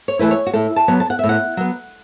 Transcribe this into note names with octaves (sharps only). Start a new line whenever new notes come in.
C#5
E3 A3 E4 B4
C#5
F#4
A2 A4
A5
F#3 B3
A5
F#5
E5
A2
F#5
F#3 B3